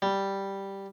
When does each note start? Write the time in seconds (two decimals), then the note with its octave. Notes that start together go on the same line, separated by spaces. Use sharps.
0.02 G3